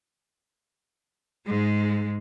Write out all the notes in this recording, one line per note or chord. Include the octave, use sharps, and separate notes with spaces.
G#2 G#3